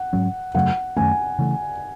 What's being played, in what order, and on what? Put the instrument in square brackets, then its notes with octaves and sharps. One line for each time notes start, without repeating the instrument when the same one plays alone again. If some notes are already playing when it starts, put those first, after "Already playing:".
Already playing: [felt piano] F#5
[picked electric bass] G#2 F#3 C#4
[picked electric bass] F#2 C#3 F#3 A3 [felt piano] F#5
[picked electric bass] F#2 D#3 A3 C#4 [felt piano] G#5
[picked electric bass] C#3 E3 A3